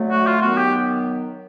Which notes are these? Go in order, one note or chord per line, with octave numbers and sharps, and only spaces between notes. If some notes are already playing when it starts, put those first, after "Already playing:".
Already playing: D3 F#3 A3
F#4
F4
D#3 F#3 B3 F#4
G4